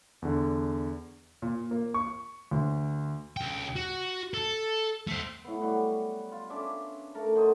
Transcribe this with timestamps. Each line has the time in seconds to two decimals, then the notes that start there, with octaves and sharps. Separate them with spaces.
0.22 E2 D3
1.42 A#2
1.71 A#3
1.94 C#6
2.51 D2
3.37 C#2 G5
3.76 F#4
4.34 A4
5.08 A3 C5
5.44 A2 B3
5.62 F#3 G3 F#4
6.32 F4
6.50 C#4 D4 E5 D6
7.14 A3 A4 A#4
7.36 F#3 C5 D#5